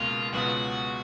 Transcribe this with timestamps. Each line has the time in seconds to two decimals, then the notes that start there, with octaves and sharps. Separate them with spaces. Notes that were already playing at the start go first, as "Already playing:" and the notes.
Already playing: C#2 B2 A#3 F4
0.33 C#2 B2 F#3 B3 F4 F#4